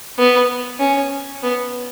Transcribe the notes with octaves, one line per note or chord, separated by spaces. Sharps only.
B3
C#4
B3